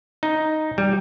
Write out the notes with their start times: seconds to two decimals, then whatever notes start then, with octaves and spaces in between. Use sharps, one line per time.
0.23 D#4
0.78 G3